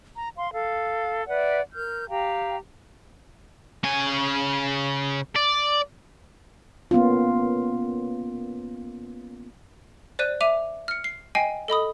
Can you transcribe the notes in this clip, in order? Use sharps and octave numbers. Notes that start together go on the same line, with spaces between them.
A#5
F5 C6
A4 F5
B4 D5 E5 F#5
A#4 F6 G6
G4 F5 G5 A#5
C#3 G#5
D5
A#3 B3 C#4 F4
C5 D5 F#6 D#7
E5 D6 D#7 F7
F6 C#7
C7
D#5 G5 G#5 C7
A4 D#5 B5 D#6